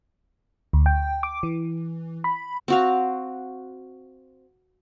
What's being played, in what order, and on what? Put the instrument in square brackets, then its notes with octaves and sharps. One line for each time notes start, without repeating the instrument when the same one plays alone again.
[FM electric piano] D2
G5
D6
E3
B5
[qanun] C4 F#4 F5